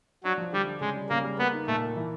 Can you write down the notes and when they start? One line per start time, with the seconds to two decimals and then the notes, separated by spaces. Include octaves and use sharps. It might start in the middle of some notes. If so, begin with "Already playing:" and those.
0.24 F#3 D4
0.38 F3
0.52 D3 G3
0.66 D4
0.81 C#3 G#3
0.95 G3
1.10 C#3 A#3
1.24 G3
1.38 A#3 B3
1.53 D#4
1.67 A#2 A3
1.82 A#3
1.96 E3